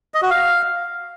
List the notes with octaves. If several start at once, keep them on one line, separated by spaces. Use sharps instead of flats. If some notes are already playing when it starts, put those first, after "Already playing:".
D#5
F#4
F5